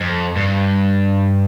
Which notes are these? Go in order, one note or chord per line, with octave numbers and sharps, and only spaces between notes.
F2
G2